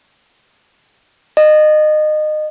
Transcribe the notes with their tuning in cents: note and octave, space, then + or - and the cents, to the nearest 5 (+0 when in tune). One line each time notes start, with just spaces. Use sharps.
D#5 -25